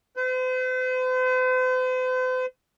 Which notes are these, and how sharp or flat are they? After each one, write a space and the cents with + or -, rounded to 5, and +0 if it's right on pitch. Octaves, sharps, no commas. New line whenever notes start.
C5 -45